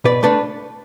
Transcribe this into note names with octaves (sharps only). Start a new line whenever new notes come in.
B2 B4 D5
A3 D4 B4 D5